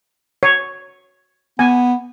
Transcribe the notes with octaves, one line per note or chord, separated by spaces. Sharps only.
C#5
B3 G#5